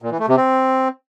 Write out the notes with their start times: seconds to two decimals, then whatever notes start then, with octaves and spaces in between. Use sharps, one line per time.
0.02 A#2
0.11 E3
0.20 A3
0.28 C3
0.37 C4